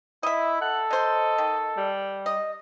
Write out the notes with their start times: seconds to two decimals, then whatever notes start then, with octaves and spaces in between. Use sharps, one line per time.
0.23 E4 D#5 E5
0.62 A4 F#5
0.91 F#3 C5 D#5
1.38 D#3
1.77 G3
2.26 D#5